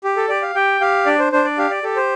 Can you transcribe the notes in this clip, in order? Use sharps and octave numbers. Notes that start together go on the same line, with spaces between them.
G4
A4
G4 D5
F5
G4 G5
G4 F5
D4 D5
C5
D4 C5
D5
G4 F5
D5
G4 A4
C5